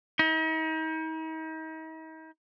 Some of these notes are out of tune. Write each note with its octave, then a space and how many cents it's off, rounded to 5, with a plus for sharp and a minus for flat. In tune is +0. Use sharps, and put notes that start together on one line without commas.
D#4 +40